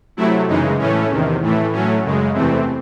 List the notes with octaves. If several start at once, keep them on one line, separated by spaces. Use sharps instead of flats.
C3 F#3 A3 E4
F#2 C#3 E3 G#3 D#4
A2 E3 A3 C#4
E2 C3 D#3
A2 E3 A3
A2 F#3 A3 C#4
F#2 C#3 G#3
E2 C3 E3 A3 C4